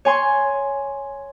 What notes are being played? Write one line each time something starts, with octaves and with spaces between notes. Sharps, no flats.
C#5 G#5 C6 C#6